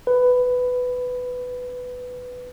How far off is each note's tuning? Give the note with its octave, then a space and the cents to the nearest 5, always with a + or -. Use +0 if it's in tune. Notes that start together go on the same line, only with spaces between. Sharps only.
B4 +10